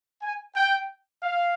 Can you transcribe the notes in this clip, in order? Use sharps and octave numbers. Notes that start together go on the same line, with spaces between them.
G#5
G5
F5